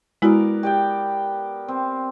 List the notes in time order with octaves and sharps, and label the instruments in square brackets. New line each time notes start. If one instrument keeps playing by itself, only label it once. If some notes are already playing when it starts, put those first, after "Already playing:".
[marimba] G#3 E4 F#4 [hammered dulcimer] B3 A#4 D5
[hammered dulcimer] G4 D5 G5
C4